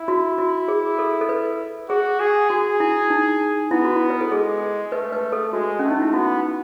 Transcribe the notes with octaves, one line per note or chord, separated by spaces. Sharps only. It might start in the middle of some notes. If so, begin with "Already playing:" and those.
Already playing: E4
F#4
F#4
G#4
A4
A4
B4
F#4 G#4
G#4
F#4 G#4
E4
D#4
B3 E4
F#4
E4
B4
A4
G#3 G#4
A3 B4
B4
A4
G#3 F#4
A3 C#4
D#4
E4
B3 F#4